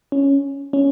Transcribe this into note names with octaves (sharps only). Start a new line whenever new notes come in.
C#4
C#4